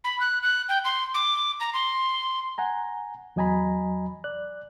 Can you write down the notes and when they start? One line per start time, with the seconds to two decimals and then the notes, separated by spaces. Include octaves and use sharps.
0.04 B5
0.20 F#6
0.43 F#6
0.69 G5
0.84 C6
1.14 D6
1.60 A#5
1.73 C6
2.58 F#5 G#5 A#5
3.36 E2 F#3 D#5 G#5 A#5 B5
4.24 D5 F#6